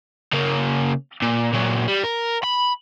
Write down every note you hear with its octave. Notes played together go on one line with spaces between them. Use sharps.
C#3 A#3
A#2
A#2 F#3
G3
A#4
B5